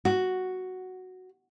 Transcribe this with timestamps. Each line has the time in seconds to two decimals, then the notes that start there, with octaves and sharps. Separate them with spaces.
0.05 F#4